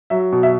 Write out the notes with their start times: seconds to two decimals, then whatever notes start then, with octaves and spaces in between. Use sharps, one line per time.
0.10 F#3 E5
0.33 B2
0.43 E5